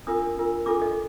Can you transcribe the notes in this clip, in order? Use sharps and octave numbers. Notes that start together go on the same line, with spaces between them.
D4 F4 A#4 D#6
D4 F4 A#4
D4 F4 A4 D6
D#5